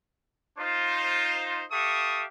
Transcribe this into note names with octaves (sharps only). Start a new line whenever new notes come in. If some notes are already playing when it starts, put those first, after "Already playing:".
D#4 F4 C5
G4 A4 E5 F5 C#6 D#6